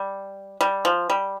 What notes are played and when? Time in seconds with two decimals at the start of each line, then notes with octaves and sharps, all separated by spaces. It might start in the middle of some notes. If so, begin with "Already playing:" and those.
Already playing: G3
0.61 G3
0.85 F3
1.10 G3